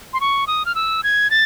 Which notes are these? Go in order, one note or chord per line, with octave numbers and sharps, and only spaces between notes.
C6
C#6
D#6
F6
E6
G#6
A6